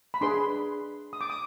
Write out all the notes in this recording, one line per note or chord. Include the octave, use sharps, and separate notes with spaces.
B5
D4 G#4 B4 C6
D#6
D6
D#6